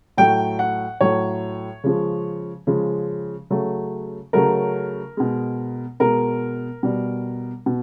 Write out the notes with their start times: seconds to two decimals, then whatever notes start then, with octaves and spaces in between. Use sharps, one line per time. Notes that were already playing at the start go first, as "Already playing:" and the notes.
0.17 A2 F#3 A3 G5
0.59 F#5
1.01 A2 F#3 A3 C#5
1.84 C#3 F3 G#3
2.67 C#3 F3 G#3
3.50 C#3 F#3 A3
4.33 C#3 F#3 A3 A#4
5.17 B2 G#3
6.00 B2 G#3 A#4
6.83 B2 G3
7.66 B2